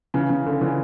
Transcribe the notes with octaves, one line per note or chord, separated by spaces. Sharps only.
C#3 E3
C#3
D3
C#3 E3